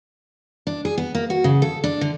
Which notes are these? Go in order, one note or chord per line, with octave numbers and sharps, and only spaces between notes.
D4
G#4
B3
A#3
F#4
C#3
A4
D4
D3